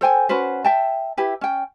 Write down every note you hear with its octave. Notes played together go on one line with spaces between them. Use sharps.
A4 C5 G5 G#5
C#4 F#4 B4 C5
E5 G5 A5
E4 G4 B4
C#4 G5